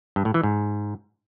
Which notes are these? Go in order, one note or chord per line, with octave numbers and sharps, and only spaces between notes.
G2
A2
E3
G#2